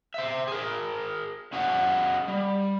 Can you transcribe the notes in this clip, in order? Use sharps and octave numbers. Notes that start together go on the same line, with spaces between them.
C5 E5
G#4 A#4
C#4 F#4 G#4 D#5 F5 F#5
G3